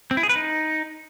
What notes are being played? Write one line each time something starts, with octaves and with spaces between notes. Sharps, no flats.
C4
E4
G#4
B4
D#4